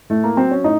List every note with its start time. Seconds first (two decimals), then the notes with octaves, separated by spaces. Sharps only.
0.10 A2 A3
0.24 A#3
0.37 F#3 C4
0.51 C#4
0.64 A2 D#4